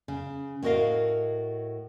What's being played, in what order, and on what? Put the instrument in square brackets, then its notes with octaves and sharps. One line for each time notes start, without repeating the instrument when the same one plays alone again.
[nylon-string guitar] C#3
A2 B3 F#4 A#4 D#5 F5